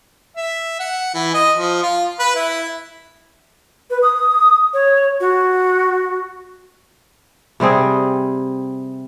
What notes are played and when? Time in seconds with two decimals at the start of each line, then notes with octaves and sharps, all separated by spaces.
0.37 E5
0.80 F#5
1.15 E3
1.34 D#5
1.57 F3
1.83 F4
2.19 B4
2.36 E4
3.91 B4
4.02 D#6
4.74 C#5
5.20 F#4
7.60 C3 G3 C4 G#4